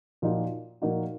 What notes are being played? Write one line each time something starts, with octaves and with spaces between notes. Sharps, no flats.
A#2 F3 A#3 D#4 F#4
A#2 F3 A#3 D#4 F#4